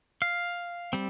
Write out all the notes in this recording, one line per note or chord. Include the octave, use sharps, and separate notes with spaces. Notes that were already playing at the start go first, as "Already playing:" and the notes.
F5
G3 C4